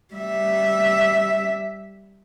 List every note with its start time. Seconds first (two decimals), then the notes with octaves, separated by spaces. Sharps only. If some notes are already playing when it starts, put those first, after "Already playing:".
0.14 G3 E5